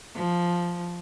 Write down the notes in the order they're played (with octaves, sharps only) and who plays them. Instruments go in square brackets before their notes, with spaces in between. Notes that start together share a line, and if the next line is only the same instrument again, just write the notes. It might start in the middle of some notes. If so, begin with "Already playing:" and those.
[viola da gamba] F3